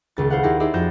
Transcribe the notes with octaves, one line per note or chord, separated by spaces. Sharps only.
D#1 C#2 A6
E4 C5 F5 F#5
D#2 E4 G4 G#4 A#6
D#4 E4 G#4 C5 D5 E5
F2 F#4 G6 A6 A#6 E7